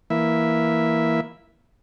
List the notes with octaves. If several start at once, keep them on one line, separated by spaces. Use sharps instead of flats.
E3 A#3 E5